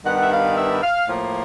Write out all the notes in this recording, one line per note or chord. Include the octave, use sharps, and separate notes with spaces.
G2 D#3 G3 B3 F#5
E5
F5
E5
F5
A2 F3 A#3